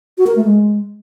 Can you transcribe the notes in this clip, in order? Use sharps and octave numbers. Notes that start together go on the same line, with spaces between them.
F#4
A#4
A3
G#3